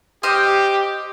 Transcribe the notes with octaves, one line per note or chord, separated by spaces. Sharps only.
G4 C5 D#5 F6